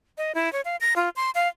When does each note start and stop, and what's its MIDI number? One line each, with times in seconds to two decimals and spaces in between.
0.18 0.32 75
0.35 0.52 64
0.53 0.61 73
0.65 0.76 77
0.81 0.94 94
0.96 1.09 65
1.16 1.30 84
1.35 1.48 77